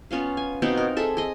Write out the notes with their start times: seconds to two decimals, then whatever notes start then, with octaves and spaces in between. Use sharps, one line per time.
0.11 B3 C#4 F4 F5
0.37 G#5
0.62 B2 B3 C4 D#4
0.77 A#4
0.96 G#4 A4 E5
1.17 G#4 D#5